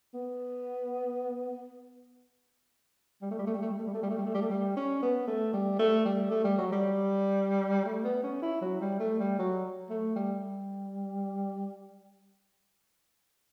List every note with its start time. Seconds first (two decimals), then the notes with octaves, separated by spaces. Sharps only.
0.14 B3
3.22 G3
3.30 A3
3.39 G3
3.47 A3
3.54 G3
3.62 A3
3.70 G3
3.79 A3
3.87 G3
3.94 A3
4.03 G3
4.10 A3
4.18 G3
4.26 A3
4.34 G3
4.42 A3
4.50 G3
4.76 C#4
5.02 B3
5.27 A3
5.53 G3
5.79 A3
6.05 G3
6.30 A3
6.44 G3
6.58 F#3
6.72 G3
7.85 A3
8.04 B3
8.23 C#4
8.42 E4
8.61 F#3
8.81 G3
9.00 A3
9.19 G3
9.39 F#3
9.90 A3
10.16 G3